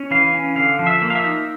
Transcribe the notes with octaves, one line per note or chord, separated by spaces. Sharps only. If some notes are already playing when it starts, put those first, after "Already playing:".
Already playing: C#4
E3 F5
C#4
D3 F5
F3
E5
A#3
F5
E5
D#4